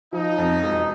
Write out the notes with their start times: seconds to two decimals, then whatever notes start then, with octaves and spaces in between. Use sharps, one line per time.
0.13 F3 D#4
0.38 F2
0.63 E1